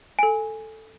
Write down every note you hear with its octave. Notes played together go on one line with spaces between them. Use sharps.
A4 G#5